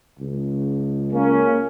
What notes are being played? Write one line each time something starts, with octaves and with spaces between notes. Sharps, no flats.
C#2
A#3 C#4